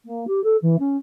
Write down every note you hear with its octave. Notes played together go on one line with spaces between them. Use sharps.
A#3
G4
A4
E3
C#4